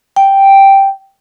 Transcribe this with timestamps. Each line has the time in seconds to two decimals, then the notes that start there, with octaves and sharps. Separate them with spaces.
0.16 G5